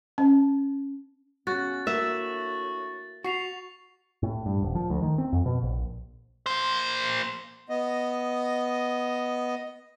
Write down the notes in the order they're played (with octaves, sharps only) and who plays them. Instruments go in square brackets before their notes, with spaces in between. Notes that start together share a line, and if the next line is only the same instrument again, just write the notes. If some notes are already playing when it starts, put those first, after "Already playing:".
[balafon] C#4
[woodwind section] C#3 B3 C#4 [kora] F#4 [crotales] A6
[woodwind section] A2 D4 F#4 [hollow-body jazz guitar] A#3 [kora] E5
[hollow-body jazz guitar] F#4 [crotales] C#6 C7 F7
[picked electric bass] A2
G2
D#1
F3
D2
D#3
C4
F2
B2
A#1
[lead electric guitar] A#3 C5
[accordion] B3 D#5